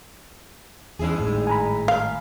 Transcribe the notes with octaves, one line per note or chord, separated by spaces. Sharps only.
E2 G2 C#4 E4 G#4
G#1 A2 G3
G#5 A#5 B5
F5